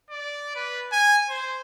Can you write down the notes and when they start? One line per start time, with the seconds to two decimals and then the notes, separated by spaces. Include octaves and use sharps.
0.10 D5
0.56 B4
0.92 G#5
1.29 C5